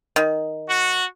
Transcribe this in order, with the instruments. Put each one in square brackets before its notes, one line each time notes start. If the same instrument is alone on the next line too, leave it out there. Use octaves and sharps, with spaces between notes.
[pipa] D#3
[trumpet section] F#4